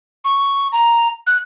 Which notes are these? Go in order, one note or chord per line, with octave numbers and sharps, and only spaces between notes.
C#6
A#5
F#6